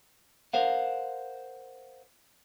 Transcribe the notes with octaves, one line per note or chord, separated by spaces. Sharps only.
A#4 C5 F5 F#5